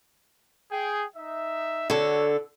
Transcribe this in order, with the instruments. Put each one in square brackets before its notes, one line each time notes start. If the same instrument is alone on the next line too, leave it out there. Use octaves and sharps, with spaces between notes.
[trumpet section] G#4 G5
D#4 E5
[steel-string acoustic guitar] D3 A4 [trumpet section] F#4 C#5